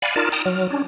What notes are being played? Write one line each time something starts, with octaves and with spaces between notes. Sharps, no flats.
D5 F5 F#5 G#5 B5
D#4 F4 A#4 D5 A5
G5 A5 A#5 D#6
F#3 F6
C#4 D4